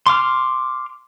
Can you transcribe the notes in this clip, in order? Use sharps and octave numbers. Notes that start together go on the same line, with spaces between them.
C6 D6 F6